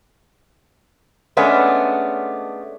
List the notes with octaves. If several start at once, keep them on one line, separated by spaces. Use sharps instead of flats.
G#3 A3 B3 C#4 D4